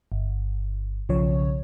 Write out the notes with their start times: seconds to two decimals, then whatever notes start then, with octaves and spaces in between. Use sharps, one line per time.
0.12 G1
1.09 B1 C#3 F3 C#5